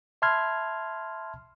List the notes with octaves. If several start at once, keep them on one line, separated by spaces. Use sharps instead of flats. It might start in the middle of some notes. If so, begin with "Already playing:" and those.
E5 A5 B5 C6 F6 G#6